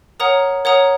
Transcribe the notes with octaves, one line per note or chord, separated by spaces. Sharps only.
A#4 C#5 F#5 A#5 D#6
A#4 C#5 F#5 A#5 D#6